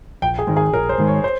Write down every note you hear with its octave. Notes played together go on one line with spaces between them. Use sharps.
A#1 G5
G#4
G#2 D#3 G#3
G#4
A#1 A#4
C5
G#2 D#3 G#3
C#5
C5